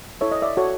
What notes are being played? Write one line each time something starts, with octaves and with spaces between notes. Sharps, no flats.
E4 A4 C#5 E5
D#5
D5 E5
F#4 A4 C#5